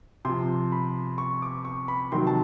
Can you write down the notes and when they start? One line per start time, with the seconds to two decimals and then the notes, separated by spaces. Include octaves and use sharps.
0.25 C3 F3 C6
0.72 B5
1.18 C#6
1.42 D6
1.65 C#6
1.88 B5
2.12 C3 D#3 F#3 C6
2.27 A5